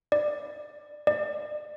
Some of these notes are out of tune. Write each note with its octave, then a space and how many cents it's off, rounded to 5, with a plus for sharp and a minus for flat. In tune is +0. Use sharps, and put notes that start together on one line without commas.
D5 +20
D5 +35